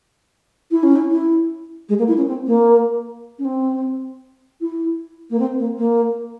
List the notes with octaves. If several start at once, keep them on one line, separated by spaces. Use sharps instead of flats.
E4
C#4
E4
E4
G#3
A#3
E4
C#4
C4
A#3
C#4
C4
E4
A#3
C4
A#3
A#3